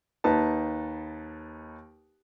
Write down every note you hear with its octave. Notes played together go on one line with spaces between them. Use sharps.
D#2 D#4 B4 A5